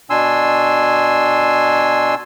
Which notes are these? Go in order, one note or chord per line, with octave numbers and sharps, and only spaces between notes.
B2 D4 G#5 C6 E6